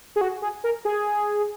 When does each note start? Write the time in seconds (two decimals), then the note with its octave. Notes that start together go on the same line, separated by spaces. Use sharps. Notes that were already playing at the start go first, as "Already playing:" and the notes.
0.16 G#4
0.21 F#4
0.42 G#4
0.64 A#4
0.85 G#4